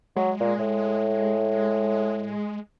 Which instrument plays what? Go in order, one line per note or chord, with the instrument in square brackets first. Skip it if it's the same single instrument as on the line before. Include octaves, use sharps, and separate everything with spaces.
[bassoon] F#3 [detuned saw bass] G#3
[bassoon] A#2
A2